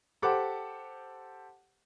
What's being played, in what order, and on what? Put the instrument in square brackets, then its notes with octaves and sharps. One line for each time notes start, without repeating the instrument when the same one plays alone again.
[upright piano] G4 A4 C5 F#5 A5 D6